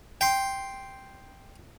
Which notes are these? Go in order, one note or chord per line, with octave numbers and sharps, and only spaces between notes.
G5 C6